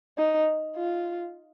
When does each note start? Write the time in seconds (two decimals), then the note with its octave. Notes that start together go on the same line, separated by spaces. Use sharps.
0.18 D#4
0.76 F4